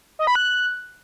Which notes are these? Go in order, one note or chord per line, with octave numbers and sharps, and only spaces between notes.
D#5
B5
F#6